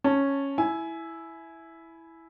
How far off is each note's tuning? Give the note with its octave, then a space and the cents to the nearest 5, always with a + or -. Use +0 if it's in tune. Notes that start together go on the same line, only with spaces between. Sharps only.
C#4 -5 A5 +0
E4 +0 G#5 +20